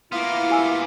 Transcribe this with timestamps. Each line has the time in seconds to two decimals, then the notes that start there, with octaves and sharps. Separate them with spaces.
0.12 A#3 B3 E4 F4 C6 F6
0.50 G4 G#5 E6